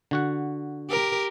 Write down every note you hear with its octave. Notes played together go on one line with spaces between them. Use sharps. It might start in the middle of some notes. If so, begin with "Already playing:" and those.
D3 F#4 F#5
G4 A#4